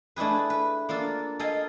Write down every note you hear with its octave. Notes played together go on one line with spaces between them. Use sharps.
A3 D4 E4 G#4 B4
B4
A#3 D4 F4 A4
A4 A#4 D#5 F5 G#5